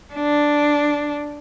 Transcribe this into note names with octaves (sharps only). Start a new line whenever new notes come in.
D4